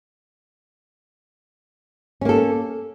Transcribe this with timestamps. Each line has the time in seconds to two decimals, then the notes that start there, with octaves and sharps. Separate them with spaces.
2.21 C#4
2.25 A#3
2.29 A4